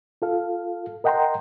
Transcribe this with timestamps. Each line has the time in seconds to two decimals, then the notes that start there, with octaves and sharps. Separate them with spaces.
0.22 F4 A4 F5
1.04 A#4 D#5 F#5 G5 A#5 C6